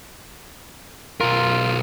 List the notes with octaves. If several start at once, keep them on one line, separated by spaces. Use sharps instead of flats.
B1 F4 A#4